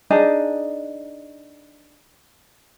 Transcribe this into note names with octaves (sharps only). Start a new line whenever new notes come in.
D4 D#4 G#4